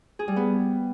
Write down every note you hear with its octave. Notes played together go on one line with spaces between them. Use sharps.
G#4
G3
B3